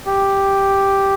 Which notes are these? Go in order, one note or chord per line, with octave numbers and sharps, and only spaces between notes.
G4